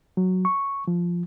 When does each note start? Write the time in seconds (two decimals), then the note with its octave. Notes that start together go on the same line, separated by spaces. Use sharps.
0.17 F#3
0.45 C#6
0.88 F3